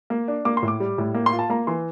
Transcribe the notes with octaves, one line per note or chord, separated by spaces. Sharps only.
A#3
D4
A#3 D6
C6
A2
D6
G3
A2
A#3
C6
F4
A5
A#3 A#5
E3 C6